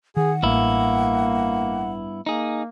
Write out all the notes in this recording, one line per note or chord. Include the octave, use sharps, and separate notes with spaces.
D#3 G#4 F#5
A1 G2 A#3 B3 E4
A#3 D#4 G#4